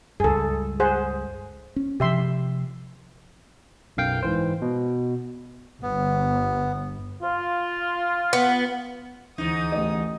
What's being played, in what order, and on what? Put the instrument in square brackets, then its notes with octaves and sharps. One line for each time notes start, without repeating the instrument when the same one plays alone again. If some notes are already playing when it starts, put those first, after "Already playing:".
[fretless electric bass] C#2 G2 [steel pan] G#4 A4
[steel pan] G#4 C5 F#5
[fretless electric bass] C#4
[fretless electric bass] C3 F3 [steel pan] G4 E5 C6
[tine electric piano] B1 F#2 F5 G5
G#2 E3 C5
B2
[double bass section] G1 [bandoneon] B3
[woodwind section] F4
[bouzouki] B3
[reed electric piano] D2 E3 [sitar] G#2 D#4 [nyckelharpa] D#6
[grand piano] A1 D#5